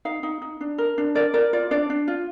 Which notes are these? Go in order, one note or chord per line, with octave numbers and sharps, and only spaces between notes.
D#4 F5
D#4
D#4
D4
A#4
D4
A#4 D5
A#4 D5
F4 D5
D4 D5
D4
F4